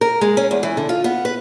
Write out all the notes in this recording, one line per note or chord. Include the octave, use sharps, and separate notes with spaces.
A#4
G#3
C#4
E2
E3
D3
F4
B3
B4